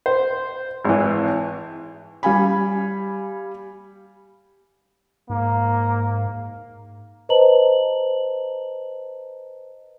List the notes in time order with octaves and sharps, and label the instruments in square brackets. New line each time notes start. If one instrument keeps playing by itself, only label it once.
[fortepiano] C5
G#1 E3
[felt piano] G3 F5 G#5 B5
[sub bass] G#2 [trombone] A#3
[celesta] B4 C5 D#5 A5 A#5 F#7